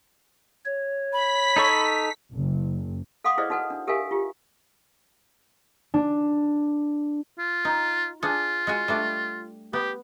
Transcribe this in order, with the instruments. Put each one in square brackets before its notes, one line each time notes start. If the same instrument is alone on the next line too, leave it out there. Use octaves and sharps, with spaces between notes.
[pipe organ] C#5
[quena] B5 [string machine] B6
[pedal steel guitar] D#4 A4 C#6
[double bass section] F#1
[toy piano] A4 F5 F#5 C6 D6 D#6
E4 G#4 B4 C5 D5 D#5
D#4 F#4 A4 B4 F#5
D4
G4 A4 A#4 E5 F5 G#5
F4 G4
[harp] D4
[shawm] F4
[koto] D#4
[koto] D4 G#4 [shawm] F4
[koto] G#3 F#4 G#5
G3 A3 D4
[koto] B3 [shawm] G4